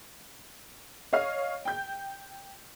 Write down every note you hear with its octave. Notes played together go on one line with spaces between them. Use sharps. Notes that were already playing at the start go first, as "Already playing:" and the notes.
C#5 D#5 F5 F6
G5 G6